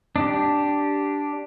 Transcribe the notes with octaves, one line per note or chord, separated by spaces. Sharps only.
D4 G4